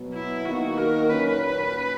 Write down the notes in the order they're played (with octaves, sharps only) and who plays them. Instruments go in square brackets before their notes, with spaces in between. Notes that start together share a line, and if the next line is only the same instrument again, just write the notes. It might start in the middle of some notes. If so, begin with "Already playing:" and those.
Already playing: [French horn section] B2 F#3 B3
[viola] E4
[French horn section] D#3 A#3 D#4 [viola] F#4
[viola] A#4
[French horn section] A#2 F#3 C#4 [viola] B4